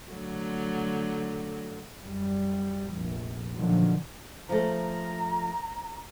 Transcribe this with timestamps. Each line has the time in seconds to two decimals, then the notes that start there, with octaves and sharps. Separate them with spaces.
0.12 D3 F#3 A3
1.98 F#2 G3
2.92 F1 A#1
3.56 A#2 D3 D#3 F3 F#3
4.49 F3 A3 A#5